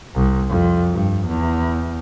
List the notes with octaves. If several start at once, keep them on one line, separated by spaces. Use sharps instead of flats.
C2
F2
G2
E2